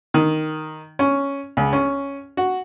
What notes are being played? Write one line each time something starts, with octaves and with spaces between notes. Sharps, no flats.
D#3
C#4
C#2
C#4
F#4